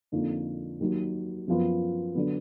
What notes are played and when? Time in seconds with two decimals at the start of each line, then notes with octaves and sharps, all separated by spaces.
0.12 F2 D3 F3 A#3 D#4
0.80 D#2 D#3 F#3
1.48 F#2 F3 B3 F4
2.15 D3 F#3 B3